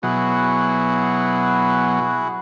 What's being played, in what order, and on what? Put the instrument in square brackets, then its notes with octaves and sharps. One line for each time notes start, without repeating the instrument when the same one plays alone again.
[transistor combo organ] B2 F#3 [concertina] E4 F#4 G#4